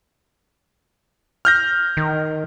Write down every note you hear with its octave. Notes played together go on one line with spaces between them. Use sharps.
F6 G6 A#6
D#3